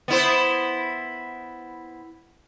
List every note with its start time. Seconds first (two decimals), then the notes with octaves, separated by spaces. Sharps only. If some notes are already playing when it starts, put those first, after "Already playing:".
0.08 B3 E4 C5